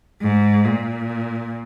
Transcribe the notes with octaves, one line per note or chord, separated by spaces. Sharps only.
G#2
A#2